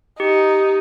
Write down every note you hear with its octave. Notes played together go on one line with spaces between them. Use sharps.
D#4 G4